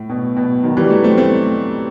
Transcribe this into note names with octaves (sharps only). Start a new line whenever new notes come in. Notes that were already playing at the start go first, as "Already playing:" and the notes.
Already playing: A2
B2
B2
D#3 F#3
E3 G3
F#3 A3
A3 C4
A3 C4